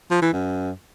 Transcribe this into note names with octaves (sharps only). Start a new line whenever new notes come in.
F3
E3
F#2